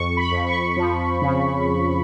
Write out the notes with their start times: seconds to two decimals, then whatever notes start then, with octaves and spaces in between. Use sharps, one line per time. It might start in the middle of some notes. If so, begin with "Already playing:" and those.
Already playing: F2 C#6
0.17 B5
0.32 F2
0.47 C#6
0.76 F3
1.22 C#3